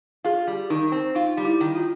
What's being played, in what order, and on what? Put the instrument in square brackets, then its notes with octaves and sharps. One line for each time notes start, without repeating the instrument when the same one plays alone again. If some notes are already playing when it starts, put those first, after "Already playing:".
[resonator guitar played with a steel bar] F4 [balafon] G#4
[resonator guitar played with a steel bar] G3
[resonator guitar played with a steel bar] D#3 [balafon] D#4
[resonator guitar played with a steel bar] C4
[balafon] D#4 [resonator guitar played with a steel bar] F4
[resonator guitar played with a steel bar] G3
[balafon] E4
[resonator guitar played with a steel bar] D#3
[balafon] F4